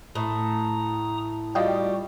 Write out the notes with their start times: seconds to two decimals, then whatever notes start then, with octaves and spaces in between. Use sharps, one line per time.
0.15 A2 A#5 D#6
1.55 G3 F4 F#4 D#5 G5